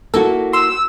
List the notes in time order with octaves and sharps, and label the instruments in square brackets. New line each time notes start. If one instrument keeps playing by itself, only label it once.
[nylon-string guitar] A#3 E4 F#4 [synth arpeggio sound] A4
[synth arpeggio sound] C6 [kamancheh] E6